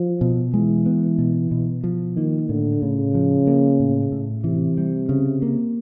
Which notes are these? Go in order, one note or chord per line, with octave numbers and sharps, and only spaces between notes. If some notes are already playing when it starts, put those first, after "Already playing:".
Already playing: F3
B2
E3 G#3
B3
B2
B2
F3
D#3 A#3
A2 D3
A2 C#3
F3
A#3
A2
A2
C3 E3
G3
C#3
A#3